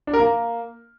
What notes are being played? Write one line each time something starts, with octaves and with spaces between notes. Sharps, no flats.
D4
A#4
A#3